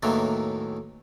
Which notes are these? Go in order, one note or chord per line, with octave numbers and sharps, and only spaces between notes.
E2 A2 D#3 E3 F#3 A#3